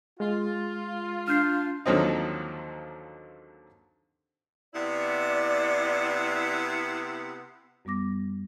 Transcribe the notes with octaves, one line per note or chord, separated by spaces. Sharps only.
G#3 F4
D4 F6 G6 C7
D#2 D3 F3 F#3 C4 D#4
C3 B3 E4 D5
F#2 G3 B3 D6 A#6